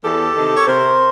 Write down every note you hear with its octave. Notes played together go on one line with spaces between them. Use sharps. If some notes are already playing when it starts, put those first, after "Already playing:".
E2 G4 A4
C3 D#3
C#5
C3 A#4 C5